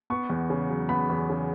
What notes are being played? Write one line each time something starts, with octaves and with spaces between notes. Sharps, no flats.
B3 C#6
E2
C#3
F#3
B3 B5
E2
C#3